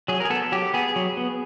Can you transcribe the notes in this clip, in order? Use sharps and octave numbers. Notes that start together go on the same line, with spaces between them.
F#3 G#4
G#4 A#4
B3 A4
F#3 G4
B3 G#4
F#3
B3